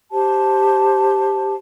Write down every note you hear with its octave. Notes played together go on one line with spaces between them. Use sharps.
G4 C5 A5